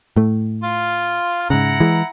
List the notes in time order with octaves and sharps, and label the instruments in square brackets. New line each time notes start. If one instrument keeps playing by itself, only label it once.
[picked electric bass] A2 A3
[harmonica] F4 F5
[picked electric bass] G#2 C#3 [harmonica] E4 F#5 A#5
[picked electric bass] E3 G#3